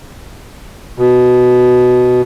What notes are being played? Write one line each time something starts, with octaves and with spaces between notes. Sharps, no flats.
B2